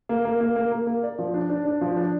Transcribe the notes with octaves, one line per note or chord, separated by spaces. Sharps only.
A#3
A#3
A#3
A#3
A#3
A#3
D5
F3
D4
D4
D4
F3
D4